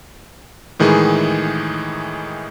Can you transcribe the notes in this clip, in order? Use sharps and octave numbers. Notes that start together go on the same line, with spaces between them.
A2 D#3 E3 G#3 G#4